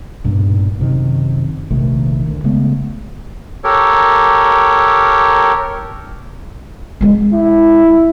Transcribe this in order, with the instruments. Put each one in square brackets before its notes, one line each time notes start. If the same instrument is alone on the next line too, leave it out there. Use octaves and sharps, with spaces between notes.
[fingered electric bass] B1 G2 A#2
F#2 C3 D#3
A#1 C3 D#3 A3
D2
C#3 G#3 A3 B3
[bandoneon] G4 A4 A#4 C#5
[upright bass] G#3 C4
[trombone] E4